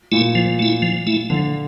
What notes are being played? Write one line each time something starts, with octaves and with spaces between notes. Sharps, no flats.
A#2 A3 E4
F3
A3 E4
F3
A3 E4
D3 F3